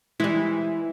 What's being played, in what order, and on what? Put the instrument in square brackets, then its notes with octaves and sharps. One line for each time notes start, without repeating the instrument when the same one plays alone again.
[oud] E3 G3 [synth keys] G#3 E4